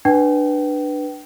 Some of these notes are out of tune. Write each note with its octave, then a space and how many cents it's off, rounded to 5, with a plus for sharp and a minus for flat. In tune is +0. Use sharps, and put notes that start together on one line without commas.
D4 +15 B4 +0 G5 -30